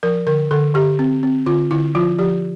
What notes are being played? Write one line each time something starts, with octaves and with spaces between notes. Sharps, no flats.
F3 A#4
D3 A#4
D3 A4
D3 G4
C4
C4
D3 F4
D3 E4
F3 F4
F3 G4